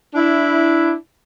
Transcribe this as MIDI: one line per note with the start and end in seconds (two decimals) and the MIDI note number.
0.15 0.93 62
0.15 0.93 64